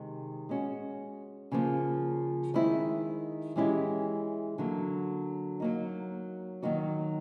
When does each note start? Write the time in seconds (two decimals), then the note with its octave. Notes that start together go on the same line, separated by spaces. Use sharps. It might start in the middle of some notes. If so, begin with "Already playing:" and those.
Already playing: C3 D#3 G#3
0.49 G#3 C#4 F#4
1.52 C#3 F3 A#3
2.54 D#3 G#3 C4 E4
3.56 E3 G#3 C#4 E4 G4
4.58 D3 F#3 A#3
5.60 F#3 A#3 D#4
6.63 D#3 F#3 A#3 D#4 F#4